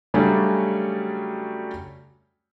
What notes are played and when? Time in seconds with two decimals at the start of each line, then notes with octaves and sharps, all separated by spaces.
0.14 C#3 F#3 G3 A3 C#4 D4